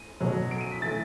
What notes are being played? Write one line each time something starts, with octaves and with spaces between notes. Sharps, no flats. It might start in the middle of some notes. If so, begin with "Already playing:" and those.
Already playing: D#7
B2 F#3
D7
D#7
B6
A2 E3 A6